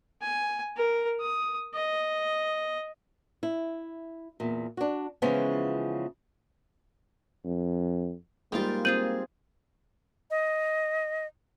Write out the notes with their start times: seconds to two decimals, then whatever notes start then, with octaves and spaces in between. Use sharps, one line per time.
0.22 G#5
0.76 A#4
1.20 D#6
1.74 D#5
3.43 E4
4.40 E2 A#2
4.77 D4 F#4
5.22 C#3 E3 F3 G#3 B3 C#4
7.44 F2
8.52 G#2 G3 A#3 F4 F5 G5
8.85 C4 F4 G#4 G6 D#7 F#7
10.31 D#5